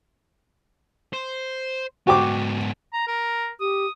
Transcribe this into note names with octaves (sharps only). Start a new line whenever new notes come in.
C5
G#2 B3 F#4 G5 D6
A#5
A#4
G4 D#6